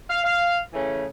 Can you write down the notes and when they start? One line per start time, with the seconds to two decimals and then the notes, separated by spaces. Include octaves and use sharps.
0.09 F5
0.24 F5
0.73 C#3 E3 A3 C#4